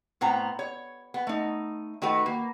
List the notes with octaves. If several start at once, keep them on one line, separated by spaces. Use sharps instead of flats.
A2 B3 C4 A#5
C#5
B3
A3 D#4
D#3 A3 F#4 B4
A#3